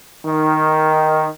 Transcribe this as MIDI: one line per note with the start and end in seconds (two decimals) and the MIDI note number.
0.25 1.27 51